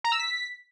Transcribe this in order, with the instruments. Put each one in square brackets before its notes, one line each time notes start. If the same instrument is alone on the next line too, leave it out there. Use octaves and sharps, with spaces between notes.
[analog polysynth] A#5
E6
B6